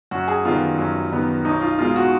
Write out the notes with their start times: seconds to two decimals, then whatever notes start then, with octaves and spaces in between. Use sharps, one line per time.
0.11 F#2 F#4
0.28 G#4
0.44 D#3 G3 B3 F4
0.79 F#2
1.12 D#3 G3 B3
1.45 B1 D#4
1.62 F4
1.79 B2 G#3 F4
1.96 F#4